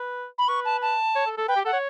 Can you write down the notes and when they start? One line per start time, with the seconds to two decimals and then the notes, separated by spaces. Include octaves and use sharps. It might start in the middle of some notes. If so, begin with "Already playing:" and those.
Already playing: B4
0.38 B5
0.48 B4 C#6
0.65 A5
0.82 A5
1.16 C#5
1.26 A4
1.37 A4
1.48 B4 G5
1.56 G4
1.65 A4 F#5
1.73 C#5